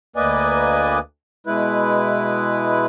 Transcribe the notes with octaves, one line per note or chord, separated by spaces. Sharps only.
D2 A#3 B4 D5 D#5 G#5
B2 G#3 E4 B4